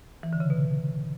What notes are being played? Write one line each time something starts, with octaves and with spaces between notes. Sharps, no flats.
E3
D3
C#3
B2